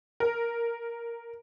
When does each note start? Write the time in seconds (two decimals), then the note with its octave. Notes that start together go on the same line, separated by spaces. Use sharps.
0.20 A#4